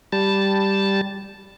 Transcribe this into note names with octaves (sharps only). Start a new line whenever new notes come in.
G3 A5